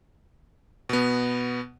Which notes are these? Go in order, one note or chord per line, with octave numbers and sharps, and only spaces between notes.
B2 B3